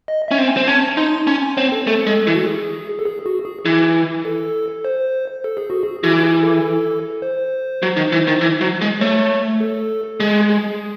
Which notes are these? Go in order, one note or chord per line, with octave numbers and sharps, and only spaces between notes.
D#5
C#4 E5
C4
G#5
C4
C#4 A5
D#4 C6
C#4 A5
G#5
C4 C#5
A4
A3 A4
G#3
E3
F#4
G#4
A4
G#4
F#4
G#4
E3
A4
C5
A4
G#4
F#4
G#4
E3 F#4
F#4
G#4
A4
C5
F#3
D#3
E3
D#3
E3
F#3
G#3
A3 C#5
A4
G#3 G#4
G#4